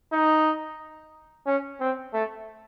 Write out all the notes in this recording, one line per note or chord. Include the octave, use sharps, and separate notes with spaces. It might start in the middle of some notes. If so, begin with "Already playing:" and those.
D#4
C#4
C4
A3